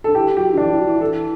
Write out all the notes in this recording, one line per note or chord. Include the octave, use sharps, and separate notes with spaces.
D3 A4
E3 G4
F#3 G4
D3
E3 D4
E3
F#3
E3
A4